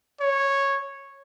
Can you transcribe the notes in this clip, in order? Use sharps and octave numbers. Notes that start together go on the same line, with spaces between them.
C#5